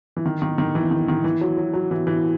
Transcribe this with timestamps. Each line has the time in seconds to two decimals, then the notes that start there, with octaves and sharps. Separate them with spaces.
0.17 E3
0.25 D#3
0.42 D#3
0.58 D#3
0.75 E3
0.91 D#3
1.08 D#3
1.24 E3
1.41 F#3
1.57 F#3
1.73 F#3
1.91 E3
2.07 E3